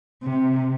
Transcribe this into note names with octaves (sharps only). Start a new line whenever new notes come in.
C3